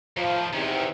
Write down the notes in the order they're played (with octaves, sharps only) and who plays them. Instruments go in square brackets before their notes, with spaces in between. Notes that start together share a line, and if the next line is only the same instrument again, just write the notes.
[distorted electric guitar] D#2 A2 [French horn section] F3
[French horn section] E2 C3 D#4 [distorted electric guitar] D#3 C#4